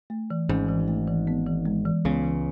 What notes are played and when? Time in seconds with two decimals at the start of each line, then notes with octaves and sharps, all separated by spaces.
0.10 A3
0.30 E3
0.49 G#1 G#2 C#4
0.68 E3
0.88 A3
1.07 E3
1.27 B3
1.47 E3
1.65 G#3
1.85 E3
2.05 C#2 C#3 B3
2.24 E3